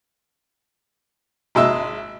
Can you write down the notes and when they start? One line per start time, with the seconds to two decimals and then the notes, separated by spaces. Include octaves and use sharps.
1.55 G#1 G#3 E5